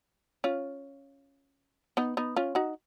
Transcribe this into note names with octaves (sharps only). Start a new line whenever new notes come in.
C#4 F4
B3 D#4
B3 D#4
C#4 F4
D#4 F#4